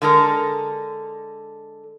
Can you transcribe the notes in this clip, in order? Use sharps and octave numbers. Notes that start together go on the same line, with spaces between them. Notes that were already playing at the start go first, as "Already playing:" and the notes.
D3 G#3 A4 A#4